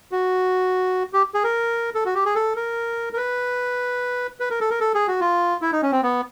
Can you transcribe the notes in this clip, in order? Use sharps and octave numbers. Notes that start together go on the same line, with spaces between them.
F#4
G4
G#4
A#4
A4
F#4
G4
G#4
A4
A#4
A#4
B4
B4
A#4
A4
A#4
A4
G#4
F#4
F4
E4
D#4
C#4
C4
B3